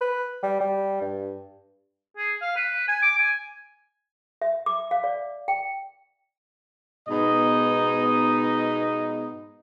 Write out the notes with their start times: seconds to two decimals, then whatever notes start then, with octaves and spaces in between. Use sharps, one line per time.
0.01 B4
0.43 G3
0.61 G3
1.01 G2
2.17 G#4
2.41 F5
2.56 B4
2.88 G#5
3.02 D6
3.18 G#5
4.42 E5
4.66 D6
4.91 F5
5.04 D5
5.48 G5
7.09 G#2 B2 B3 D#4 D#5